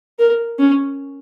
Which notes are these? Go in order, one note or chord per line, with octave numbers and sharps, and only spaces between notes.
A#4
C#4